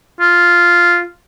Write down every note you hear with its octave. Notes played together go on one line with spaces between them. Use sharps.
F4